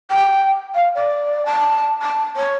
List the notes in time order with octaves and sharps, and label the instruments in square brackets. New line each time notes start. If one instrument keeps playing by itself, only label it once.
[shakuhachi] G5
F5
D5
A5
A5
C#5